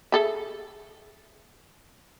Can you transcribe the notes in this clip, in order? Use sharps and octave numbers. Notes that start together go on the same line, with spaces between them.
G#4 A4 E5